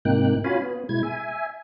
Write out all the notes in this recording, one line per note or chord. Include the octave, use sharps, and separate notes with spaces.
G#2 C3 A#3 D#4 G5 F#6
C#4 F4 F#4 F5 G#5 B5
B3
B2 G#3 E4 G#6
E5 G#5